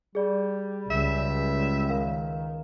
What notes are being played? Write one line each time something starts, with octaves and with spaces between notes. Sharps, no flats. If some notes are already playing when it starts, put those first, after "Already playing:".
G3 G#4 D5
C#2 E5
D#3 A#4 F5